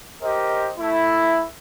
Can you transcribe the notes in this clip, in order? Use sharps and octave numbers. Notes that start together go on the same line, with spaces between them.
G4 A#4 C5 D#5
A3 E4